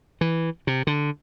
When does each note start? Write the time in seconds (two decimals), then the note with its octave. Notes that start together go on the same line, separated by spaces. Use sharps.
0.21 E3
0.67 C3
0.87 D3